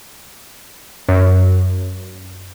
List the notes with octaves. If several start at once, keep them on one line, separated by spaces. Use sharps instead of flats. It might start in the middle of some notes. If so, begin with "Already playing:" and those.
F#2